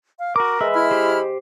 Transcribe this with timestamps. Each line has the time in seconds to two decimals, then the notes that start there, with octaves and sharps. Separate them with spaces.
0.18 F5
0.36 F#4 A#4 D6
0.61 G#3 B4 E5 E6
0.73 E4 B5 F6
0.91 G4 C5